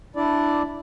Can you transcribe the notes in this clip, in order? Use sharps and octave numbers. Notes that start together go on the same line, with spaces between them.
D4 E4 D5